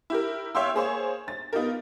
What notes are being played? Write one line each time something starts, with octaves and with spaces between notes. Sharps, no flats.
E4 G4 A#4
C#5 E5 F5 G5 C6 E6
A#3 G#4 C5 C#5
A6
B3 D#4 F4 G4 A#4